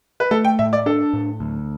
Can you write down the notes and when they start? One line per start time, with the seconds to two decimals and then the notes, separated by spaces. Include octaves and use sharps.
0.20 B4
0.31 A3 A4
0.45 G5
0.59 A2 E5
0.73 D5
0.86 D4 A4
1.13 A2
1.40 D2